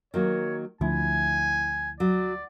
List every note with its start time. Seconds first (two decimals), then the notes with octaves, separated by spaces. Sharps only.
0.14 D#3 F#3 A#3 C#5
0.81 D2 F3 E4 G#5
2.00 F#3 D5